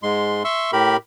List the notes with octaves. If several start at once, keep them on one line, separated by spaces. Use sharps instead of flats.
G#2 G#3 C6
E5 C6 C#6 E6
A2 G4 A#4 B5